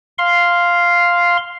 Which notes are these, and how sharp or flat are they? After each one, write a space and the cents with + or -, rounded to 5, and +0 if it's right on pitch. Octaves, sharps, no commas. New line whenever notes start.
F5 +0 C6 +0